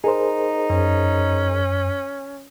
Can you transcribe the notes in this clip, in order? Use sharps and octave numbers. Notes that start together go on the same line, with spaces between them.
D#4 G#4 A#4 C5
F#2 C#4